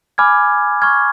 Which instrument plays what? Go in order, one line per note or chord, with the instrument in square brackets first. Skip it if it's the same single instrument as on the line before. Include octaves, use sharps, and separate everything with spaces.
[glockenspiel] G#5 B5 D6 F6 G#6
C#6 F6 G#6